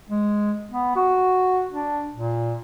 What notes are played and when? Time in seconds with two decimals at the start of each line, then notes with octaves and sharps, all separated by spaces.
0.10 G#3
0.72 B3
0.96 F#4
1.71 D4
2.13 A#2